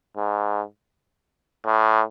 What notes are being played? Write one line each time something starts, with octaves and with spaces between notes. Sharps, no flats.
G#2
A2